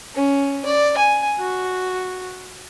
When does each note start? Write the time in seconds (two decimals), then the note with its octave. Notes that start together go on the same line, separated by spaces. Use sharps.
0.15 C#4
0.65 D5
0.97 G#5
1.39 F#4